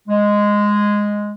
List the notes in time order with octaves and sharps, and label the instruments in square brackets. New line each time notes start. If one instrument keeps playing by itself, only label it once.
[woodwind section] G#3